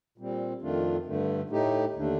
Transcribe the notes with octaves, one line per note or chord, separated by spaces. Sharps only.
A#2 G3 C4
F2 D#3 A3 D4 F4
G2 D3 A3
A2 A3 D#4 G4
D#2 D3 A3 D4